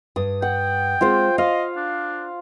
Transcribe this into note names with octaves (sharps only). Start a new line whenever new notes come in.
G2 D#6
F#5 G5
G#3 C4 F4 C5
F4 D#5 F5
D4